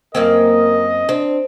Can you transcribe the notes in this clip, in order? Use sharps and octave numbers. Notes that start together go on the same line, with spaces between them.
F#2 A#3 C4 A#4 D#5
C4 D4